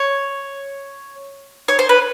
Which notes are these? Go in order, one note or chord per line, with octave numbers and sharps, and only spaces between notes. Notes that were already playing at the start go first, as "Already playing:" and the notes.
Already playing: C#5
C#5
C5
B4